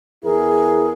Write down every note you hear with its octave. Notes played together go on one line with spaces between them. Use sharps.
E2 E4 G#4 A#4